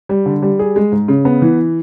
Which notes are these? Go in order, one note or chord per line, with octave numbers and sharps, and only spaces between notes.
G3
D3
G3
G#4
G#3
G#2
C#3
B3
E3